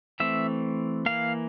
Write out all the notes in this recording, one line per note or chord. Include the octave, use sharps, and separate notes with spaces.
E3 A3 C4 E5
E3 A#3 F5